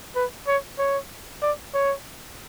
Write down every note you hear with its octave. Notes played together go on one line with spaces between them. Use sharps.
B4
C#5
C#5
D5
C#5